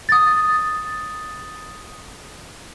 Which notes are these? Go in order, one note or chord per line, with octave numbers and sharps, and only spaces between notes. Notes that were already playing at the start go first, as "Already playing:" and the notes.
D#6 A6